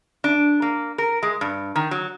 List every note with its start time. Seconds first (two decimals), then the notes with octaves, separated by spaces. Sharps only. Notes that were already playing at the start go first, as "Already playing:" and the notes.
0.24 D4
0.62 A#3
0.98 A#4
1.23 G#3
1.41 G2
1.76 D#3
1.91 F#3